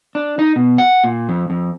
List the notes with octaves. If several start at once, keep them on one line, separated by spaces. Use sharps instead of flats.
D4
D#4
B2
F#5
A#2
F2
F2